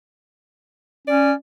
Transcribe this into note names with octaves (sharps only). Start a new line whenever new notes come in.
C#4 D5